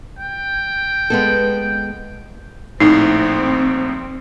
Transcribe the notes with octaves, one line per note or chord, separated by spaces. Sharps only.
G5
G#3 B3 A4
A#1 A2 C4 D#4